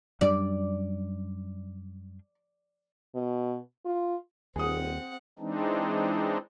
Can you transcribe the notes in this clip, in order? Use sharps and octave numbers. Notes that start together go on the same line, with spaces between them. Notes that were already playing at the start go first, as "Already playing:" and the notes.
F#2 G3 D4 D5
B2
F4
D#1 D#2 C4 G#4 F#5 D#6
E3 G#3 C4 D4 D#4